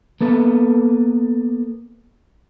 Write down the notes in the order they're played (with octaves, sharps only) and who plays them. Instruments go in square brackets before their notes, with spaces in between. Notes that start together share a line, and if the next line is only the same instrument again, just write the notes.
[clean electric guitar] A#3 B3 A4 B4